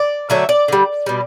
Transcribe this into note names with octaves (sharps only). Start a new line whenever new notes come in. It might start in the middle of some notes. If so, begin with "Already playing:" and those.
Already playing: D5
D3 F#3 A3 E5
D5
D3 G3
B2 G3